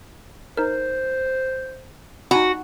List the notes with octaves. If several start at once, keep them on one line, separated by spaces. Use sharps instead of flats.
D#4 A#4 C5
D#4 F#4 G#5 B5